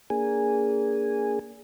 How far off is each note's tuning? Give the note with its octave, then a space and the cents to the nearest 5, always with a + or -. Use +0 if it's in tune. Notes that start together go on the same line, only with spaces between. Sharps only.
A#3 +0 D4 -35 G#4 -10